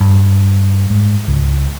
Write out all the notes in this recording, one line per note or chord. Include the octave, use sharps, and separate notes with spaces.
G2
G#2
C#2